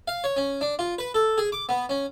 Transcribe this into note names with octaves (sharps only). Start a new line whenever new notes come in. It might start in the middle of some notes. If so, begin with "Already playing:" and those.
F5
C#5
C#4
D4
F4
B4
A4
G#4
D6
B3
C#4